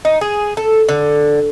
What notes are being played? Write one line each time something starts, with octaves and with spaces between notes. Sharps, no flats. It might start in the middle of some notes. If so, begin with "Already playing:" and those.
D#4
G#4
A4
D3